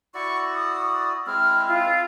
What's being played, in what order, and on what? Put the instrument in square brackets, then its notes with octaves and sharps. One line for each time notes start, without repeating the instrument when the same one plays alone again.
[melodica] E4 F#4 D5 [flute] C#6
[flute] D#6
[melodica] G#3 C4 E4 [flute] F6
[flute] F4